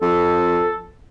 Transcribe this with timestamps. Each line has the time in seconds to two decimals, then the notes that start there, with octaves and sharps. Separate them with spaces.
0.01 F2 A4